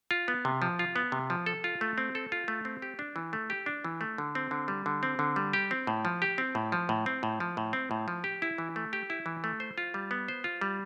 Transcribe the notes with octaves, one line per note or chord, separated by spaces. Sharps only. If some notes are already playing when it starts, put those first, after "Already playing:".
F4
B3
C3
F3
F4
B3
C3
F3
A4
F4
A3
C4
A4
F4
A3
C4
G4
D4
E3
A3
G4
D4
E3
A3
D3
C4
D3
G3
D3
C4
D3
G3
G4
C4
A2
F3
G4
C4
A2
F3
A2
C4
A2
F3
A2
C4
A2
F3
G4
E4
E3
A3
G4
E4
E3
A3
C5
F4
G3
B3
C5
F4
G3